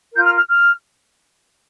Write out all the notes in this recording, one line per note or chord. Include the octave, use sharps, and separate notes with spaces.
F4 A#4 G6
F6
F6
F6